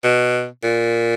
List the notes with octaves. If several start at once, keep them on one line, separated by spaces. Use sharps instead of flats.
B2
A#2